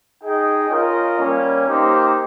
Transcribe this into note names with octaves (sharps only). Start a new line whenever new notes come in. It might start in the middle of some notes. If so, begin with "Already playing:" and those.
D#4 G#4 D#5 G5
C#4 F4 A#4 D#5
G3 A#3 C#4
A#3 D#4 G4 C5